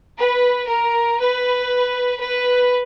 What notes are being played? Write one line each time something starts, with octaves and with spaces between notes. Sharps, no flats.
B4
A#4
B4
B4